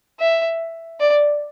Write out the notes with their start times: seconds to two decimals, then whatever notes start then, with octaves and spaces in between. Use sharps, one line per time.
0.20 E5
1.00 D5